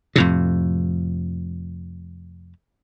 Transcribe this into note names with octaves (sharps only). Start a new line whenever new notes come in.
F2 A2 C3